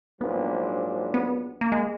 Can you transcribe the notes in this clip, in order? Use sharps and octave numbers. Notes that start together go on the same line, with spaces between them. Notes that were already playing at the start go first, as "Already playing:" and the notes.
A#1 G#2 F#3 B3 D4
B3
A#3
G#3